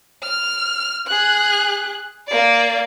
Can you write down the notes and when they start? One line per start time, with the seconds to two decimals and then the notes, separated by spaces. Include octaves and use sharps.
0.23 F6
1.07 G#4 F#6
2.28 A#3 D5